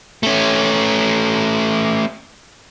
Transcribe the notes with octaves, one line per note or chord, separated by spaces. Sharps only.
A3 C#4